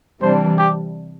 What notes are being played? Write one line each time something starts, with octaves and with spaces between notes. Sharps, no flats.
C3 E3 G3 D4 C5
G4